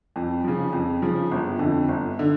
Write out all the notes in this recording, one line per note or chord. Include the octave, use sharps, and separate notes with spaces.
F2
C#3 F3
F2
C#3 F3
G1
F2 D3
G1
D3